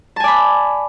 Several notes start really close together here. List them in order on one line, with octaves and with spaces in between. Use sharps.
A5 G#5 D5 B5